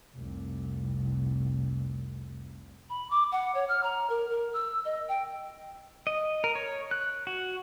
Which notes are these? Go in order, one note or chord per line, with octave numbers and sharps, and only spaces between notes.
F1 C2
B5
D6
F#5
C#5
F6
A#5
A#4
A#4
E6
D#5
G5
D#5
A#4
C#5
F#6
F#4